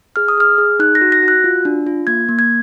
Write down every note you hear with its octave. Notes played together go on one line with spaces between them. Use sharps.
G#4 F6
D#6
G#4 F6
G#4
D#4 F#6
A#6
F#4
A#6
F#4
F#6
F4
D4
F4
A#3 G#6
A#3
G#6